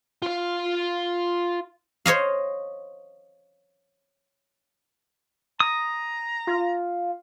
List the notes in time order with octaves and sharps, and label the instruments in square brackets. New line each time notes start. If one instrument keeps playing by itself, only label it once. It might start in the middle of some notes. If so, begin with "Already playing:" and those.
[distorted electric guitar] F4 F5
[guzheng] C5 C#5 D#5 F5
[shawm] A#5 [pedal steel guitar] D#6
[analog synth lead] F4